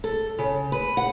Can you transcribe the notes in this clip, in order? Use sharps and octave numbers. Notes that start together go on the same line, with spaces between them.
A4
C#3
B4
F#5